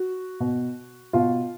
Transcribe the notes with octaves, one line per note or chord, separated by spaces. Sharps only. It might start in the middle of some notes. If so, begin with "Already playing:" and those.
Already playing: F#4
B2
B2 F4